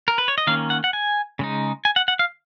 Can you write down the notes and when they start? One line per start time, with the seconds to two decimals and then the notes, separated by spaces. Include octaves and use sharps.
0.08 A#4
0.18 B4
0.28 C#5
0.38 D#5
0.47 D#3 A#3 C#4 F5
0.70 F#5
0.84 F#5
0.93 G#5
1.39 C#3 G#3 D#4
1.85 G#5
1.96 F#5
2.08 F#5
2.19 F5